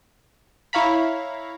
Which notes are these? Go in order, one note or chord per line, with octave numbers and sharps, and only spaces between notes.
E4 C#5 F5 A#5 B5